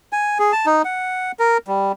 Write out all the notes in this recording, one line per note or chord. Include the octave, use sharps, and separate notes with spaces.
G#5
G#4
A5
D#4
F#5
A#4
G3